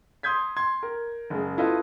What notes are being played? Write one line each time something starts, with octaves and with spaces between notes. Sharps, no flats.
C6 D#6 G6 G#6 B6
C6 G#6
A#4
F#1 G#3
E4 F4 A4 B4 D#5